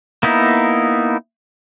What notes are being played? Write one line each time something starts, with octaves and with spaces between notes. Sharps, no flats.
A#3 B3 D#4 E4